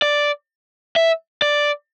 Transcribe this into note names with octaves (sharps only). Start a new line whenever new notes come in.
D5
E5
D5